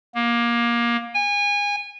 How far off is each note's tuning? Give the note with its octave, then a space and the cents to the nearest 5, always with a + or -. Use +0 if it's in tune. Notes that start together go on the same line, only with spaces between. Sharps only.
A#3 +20
G#5 -25